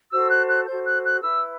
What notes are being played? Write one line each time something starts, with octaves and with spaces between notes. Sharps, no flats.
F#4 A4 C5 E6
F#6
F#6
F#4 A4 C5 G6
F#6
F#6
E4 B4 E6